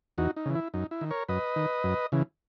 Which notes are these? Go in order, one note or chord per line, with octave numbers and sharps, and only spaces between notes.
E2 D#4 F#4
D#4
C#3 E3
E4
F#2 D#4
E4
D#3
A#4 C#5
F#2 B4 D#5
D#3
F#2
C#3 E3